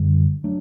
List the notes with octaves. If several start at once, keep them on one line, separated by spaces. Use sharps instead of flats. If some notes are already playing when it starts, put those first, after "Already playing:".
Already playing: F#2 D3 G3
F#3 A3 D4